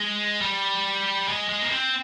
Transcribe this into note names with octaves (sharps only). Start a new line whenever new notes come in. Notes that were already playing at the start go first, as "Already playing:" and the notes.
Already playing: G#3
G3
G#3
G#3
A#3
C4